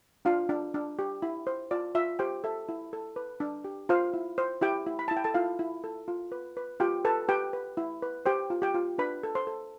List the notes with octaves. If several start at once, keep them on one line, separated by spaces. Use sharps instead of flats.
D4 F4 F5
D4
D4
G4
E4
C5
F4 D5
F4 E5
G4 C5 G5
A4 E5
E4
A4
B4
D4
G4
F4 C5 F5
E4
C5
E4 G4 G5
E4
B5
E4 A5
G5
A4 A5
E4 F4 F5
E4
A4
F4
B4
B4
F4 G4 G5
A4 B4 A5
G4 B4 G5
B4
E4
B4
G4 C5 G5
F4
G4 G5
F4
D4 B4 B5
A4
C5 C6
A4